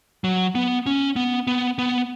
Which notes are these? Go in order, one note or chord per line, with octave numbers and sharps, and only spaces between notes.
F#3
B3
C#4
B3
B3
B3